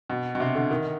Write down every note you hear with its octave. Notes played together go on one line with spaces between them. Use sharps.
B2
B2
C3
D3
D#3